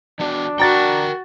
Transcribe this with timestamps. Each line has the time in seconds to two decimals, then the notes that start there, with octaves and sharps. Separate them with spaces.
0.20 E3 B3 D4 F#4
0.60 F#4 A#4 G5 A#5 A6